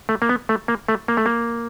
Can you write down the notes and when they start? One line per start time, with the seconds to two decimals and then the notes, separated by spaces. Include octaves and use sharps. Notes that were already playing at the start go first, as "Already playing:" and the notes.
0.09 A3
0.22 A#3
0.29 B3
0.49 A3
0.68 A#3
0.88 A3
1.08 A#3
1.17 A3
1.26 A#3